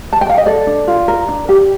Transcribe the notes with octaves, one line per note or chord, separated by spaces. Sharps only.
A5
G5
F5
D#5
A4 D5
D4
F4
A#4
D4
G4